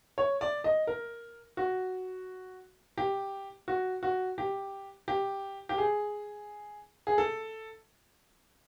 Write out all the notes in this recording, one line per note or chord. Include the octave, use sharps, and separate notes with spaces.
C#5
D5
D#5
A#4
F#4
G4
F#4
F#4
G4
G4
G4
G#4
G#4
A4